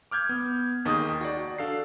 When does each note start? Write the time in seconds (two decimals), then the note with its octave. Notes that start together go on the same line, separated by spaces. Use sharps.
0.11 D6 F6 G6 G#6
0.29 B3
0.85 D#2 D#3 G#4 A#4 D#6
1.21 F#4 D5
1.58 D4 A4 F5 C7